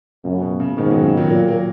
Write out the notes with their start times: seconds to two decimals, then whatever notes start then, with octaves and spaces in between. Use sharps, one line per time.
0.24 F#2 C#3
0.41 B2
0.60 C#3
0.77 G#2 B2 D#3
0.91 D#3 F#3
1.03 C#3
1.17 D#3 F#3
1.30 A#2 F#3 A#3
1.48 F#3 A#3